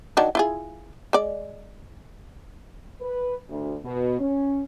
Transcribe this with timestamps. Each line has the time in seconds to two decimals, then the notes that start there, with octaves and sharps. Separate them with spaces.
0.17 D#3 F#3 D4
0.35 E4 F4 G#4
1.13 G#3 D5
3.01 B4
3.49 D2
3.84 B2
4.20 C#4